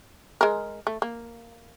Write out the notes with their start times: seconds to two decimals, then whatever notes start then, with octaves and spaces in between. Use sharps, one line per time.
0.41 G#3 A#4
0.87 A3
1.02 A#3